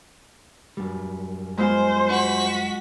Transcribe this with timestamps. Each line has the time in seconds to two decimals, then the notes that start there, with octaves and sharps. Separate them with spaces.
0.77 F#2 G3
1.58 G#3 B3 F4 C5
2.09 F#4 B6